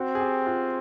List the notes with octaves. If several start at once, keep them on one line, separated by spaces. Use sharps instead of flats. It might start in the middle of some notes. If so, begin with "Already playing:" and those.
Already playing: C4 F#4
G#4
G4
F4